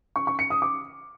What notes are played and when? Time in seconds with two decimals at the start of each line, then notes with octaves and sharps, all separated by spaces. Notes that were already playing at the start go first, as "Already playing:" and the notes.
0.16 C#6
0.27 C#6
0.39 C#7
0.50 D#6
0.62 D6